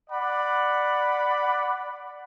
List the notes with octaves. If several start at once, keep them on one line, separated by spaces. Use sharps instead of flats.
D5 F#5 B5